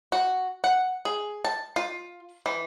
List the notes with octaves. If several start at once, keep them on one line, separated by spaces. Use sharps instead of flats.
F#4
F#5
G#4
A5
F4
E3